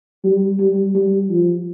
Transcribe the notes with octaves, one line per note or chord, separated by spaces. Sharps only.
G3
G3
G3
F3